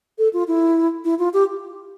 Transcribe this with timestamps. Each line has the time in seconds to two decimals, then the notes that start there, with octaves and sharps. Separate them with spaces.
0.18 A4
0.33 F4
0.48 E4
1.05 E4
1.19 F4
1.34 G4